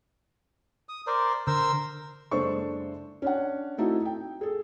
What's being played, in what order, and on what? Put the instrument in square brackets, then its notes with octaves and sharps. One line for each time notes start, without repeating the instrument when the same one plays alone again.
[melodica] D#6
A#4 C5 D5
[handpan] D3 [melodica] A#4 C5 E6
[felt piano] F#1 G#3 D4 A4 C5 C#6
C#4 D4 F#5
A3 C4 D#4 E4 F#4 A4
G5
G#4 A4